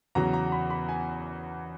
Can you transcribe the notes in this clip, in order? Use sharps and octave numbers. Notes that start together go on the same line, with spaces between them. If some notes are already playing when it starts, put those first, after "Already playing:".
E2 C#3 F#3 A#5
A#5
B5
B5
G#5